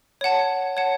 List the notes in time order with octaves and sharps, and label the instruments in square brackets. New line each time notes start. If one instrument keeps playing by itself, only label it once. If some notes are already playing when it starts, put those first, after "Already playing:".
[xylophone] C#5 F#5 A5
C#5 F#5 A5